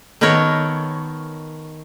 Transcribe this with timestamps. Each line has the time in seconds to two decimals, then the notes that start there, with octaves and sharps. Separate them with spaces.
0.21 D#3 B3 A4 A#4 C#5